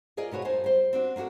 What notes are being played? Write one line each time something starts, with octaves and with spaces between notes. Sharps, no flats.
F4 G#4 A#4 D5 D#5
B2 B3 F#4 C#5
F#2 A#3 D#4 C5 G#5 A5
G3 C5
C4 D4 F#4
A#3 D4 F4 F#4 A4